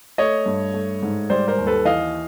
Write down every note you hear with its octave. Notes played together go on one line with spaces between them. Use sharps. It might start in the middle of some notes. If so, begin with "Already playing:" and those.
A3 C#5 D#5
G2
A3
G#2
G3 C5 D5
A#4 C5
D#2
A4 B4
E3 D#5 F5